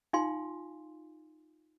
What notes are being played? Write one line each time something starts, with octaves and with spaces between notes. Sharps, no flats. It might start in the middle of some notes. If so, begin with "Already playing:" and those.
D#4 F4 F5 G#5 C6